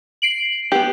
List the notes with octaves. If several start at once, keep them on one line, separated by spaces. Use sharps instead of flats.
C7 D7 F#7
B3 G4